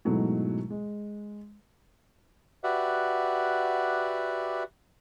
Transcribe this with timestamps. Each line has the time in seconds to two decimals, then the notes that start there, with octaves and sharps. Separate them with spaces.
0.05 G#2 B2 E3 F#3 G#3 A3
0.70 G#3
2.64 F#4 G4 B4 D5 E5 F#5